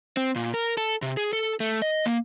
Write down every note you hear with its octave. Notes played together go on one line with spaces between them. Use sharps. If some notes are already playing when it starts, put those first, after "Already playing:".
C4
A#2
A#4
A4
C3
G#4
A4
A3
D#5
A#3